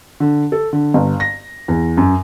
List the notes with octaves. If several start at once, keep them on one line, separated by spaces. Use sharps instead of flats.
D3
A4
D3
G1
A#6
E2
F#2